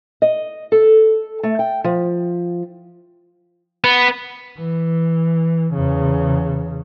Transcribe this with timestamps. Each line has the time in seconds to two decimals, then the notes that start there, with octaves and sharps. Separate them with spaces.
0.22 D#5
0.72 A4
1.43 A3
1.59 G5
1.84 F3
3.84 B3
4.58 E3
5.73 E2 C#3